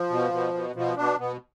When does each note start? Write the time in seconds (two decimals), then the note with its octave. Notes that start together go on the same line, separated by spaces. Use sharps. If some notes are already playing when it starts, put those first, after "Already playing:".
Already playing: F3
0.10 B2
0.32 B2
0.54 B2
0.75 B2 F3
0.97 B2 D4
1.19 B2 B3